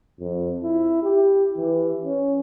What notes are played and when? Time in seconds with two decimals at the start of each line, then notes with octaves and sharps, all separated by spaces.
0.19 F2
0.63 E4
1.03 G4
1.57 E3
2.04 C#4